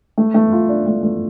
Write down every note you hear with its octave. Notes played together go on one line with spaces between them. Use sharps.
A3
A3
F4
D4
A3
A3